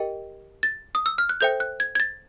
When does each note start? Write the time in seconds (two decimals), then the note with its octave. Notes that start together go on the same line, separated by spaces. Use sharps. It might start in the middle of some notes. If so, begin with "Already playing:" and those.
Already playing: G4 A#4 D#5 G5
0.63 A6
0.95 D#6
1.06 E6
1.18 F6
1.29 F#6
1.41 A4 C5 E5 G5 G6
1.60 F#6
1.80 G#6
1.95 G#6
2.00 A6